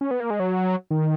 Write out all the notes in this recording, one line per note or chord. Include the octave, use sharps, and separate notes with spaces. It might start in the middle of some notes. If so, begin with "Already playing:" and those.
C#4
B3
A#3
G#3
F#3
D#3